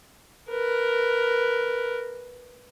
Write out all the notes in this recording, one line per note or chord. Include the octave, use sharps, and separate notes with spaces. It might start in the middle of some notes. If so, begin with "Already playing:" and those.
A#4 B4